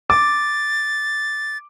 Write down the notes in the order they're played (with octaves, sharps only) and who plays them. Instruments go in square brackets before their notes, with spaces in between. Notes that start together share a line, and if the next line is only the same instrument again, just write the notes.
[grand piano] D6 [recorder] A6